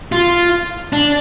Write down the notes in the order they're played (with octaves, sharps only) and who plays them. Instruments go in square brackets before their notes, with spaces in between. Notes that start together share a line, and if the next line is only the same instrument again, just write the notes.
[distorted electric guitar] F4
D4